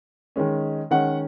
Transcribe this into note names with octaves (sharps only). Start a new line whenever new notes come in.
D#3 G#3 C#4
D#3 G#3 C#4 F#5